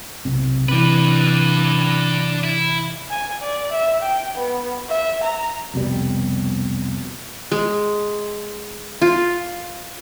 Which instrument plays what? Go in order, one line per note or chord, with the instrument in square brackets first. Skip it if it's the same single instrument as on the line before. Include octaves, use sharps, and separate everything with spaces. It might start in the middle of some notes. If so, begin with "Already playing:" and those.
[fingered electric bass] B1 C3
[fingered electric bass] C3 E3 [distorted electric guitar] D4 B4
[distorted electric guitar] E4
[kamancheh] G#5
D5
E5
G5
B3
E5
A#5
[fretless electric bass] C2 F2 B2 G3
[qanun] G#3
F4